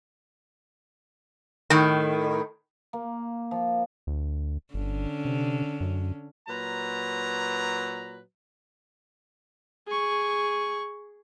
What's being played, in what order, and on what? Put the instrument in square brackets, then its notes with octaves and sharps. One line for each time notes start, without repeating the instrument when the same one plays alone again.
[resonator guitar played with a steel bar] A2 D#3
[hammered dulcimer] A#3
F3
[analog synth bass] D2
[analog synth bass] G1 [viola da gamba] D3 C#4
[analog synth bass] C3
F#2
[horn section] A#2 F#3 B4 A#5
[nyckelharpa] G#4 C#6